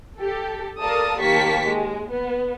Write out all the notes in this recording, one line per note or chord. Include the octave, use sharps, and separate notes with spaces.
G4 A4
A4 A#4 D5 F5 A5 D#6
D#2 A#3 G4 A5 C#6 B6
G#3
B3